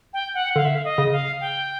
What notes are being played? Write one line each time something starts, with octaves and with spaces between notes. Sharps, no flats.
G5
F#5
D3 F5
E5
F5
D#5
C#3
F5
G5